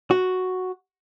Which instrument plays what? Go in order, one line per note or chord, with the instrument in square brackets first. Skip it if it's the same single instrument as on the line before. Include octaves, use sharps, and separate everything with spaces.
[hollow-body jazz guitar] F#4